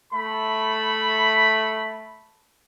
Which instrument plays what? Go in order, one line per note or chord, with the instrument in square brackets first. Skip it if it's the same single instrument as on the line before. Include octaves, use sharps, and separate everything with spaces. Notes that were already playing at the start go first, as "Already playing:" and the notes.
[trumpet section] A3 B5